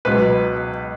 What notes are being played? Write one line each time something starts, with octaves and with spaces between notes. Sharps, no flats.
C#2 B2 F#3 B4